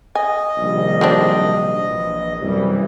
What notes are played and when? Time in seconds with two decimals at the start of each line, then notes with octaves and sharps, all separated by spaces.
0.15 D#5 G#5
0.58 A#1 C3 D#3 G3
1.01 F#3 C4 D4
1.86 A#1 E3
2.41 C2 F#2 E3 G3